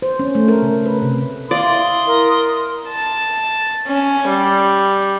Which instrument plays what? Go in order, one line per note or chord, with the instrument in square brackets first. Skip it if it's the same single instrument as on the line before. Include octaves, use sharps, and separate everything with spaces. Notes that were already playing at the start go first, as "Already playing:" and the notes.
[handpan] C5
C#4
A3
A#4
C#3
B4
C3
[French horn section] E4 [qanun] D5 [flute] F5 [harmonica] C6 D#6
[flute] A#4
[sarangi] A5
C#4
G3